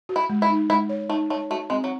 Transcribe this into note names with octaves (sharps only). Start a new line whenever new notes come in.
F#4
E4
G#3
E4
D#4
G#3 E4
C#5
A3 D#4
A3 C#5
A3 F#4
G#3 C4
F#3